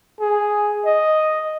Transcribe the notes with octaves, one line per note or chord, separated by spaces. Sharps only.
G#4
D#5